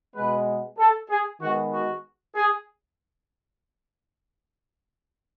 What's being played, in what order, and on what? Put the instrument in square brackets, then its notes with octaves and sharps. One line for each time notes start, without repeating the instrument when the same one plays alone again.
[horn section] B2 G#3 B3 B4
A4
G#4
D#3 G#3 B3 F#4
F#4
G#4